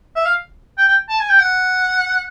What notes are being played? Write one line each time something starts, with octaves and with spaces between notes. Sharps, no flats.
E5
F5
G5
G5
A5
G#5
G5
F#5